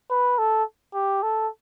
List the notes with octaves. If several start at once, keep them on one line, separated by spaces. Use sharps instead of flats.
B4
A4
G4
A4